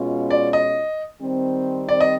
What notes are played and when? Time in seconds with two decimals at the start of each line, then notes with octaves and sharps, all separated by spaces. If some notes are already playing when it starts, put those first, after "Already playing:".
Already playing: B2 G#3 C#4 F4
0.30 D5
0.53 D#5
1.22 D#3 G3 C4
1.89 D5
2.01 D#5